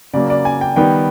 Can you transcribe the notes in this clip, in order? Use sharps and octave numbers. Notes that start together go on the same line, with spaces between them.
C#3 F#3 A#3 D5
D5
G#5
G5
D#3 G3 B3 G5